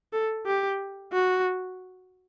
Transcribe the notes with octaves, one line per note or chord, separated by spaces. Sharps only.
A4
G4
F#4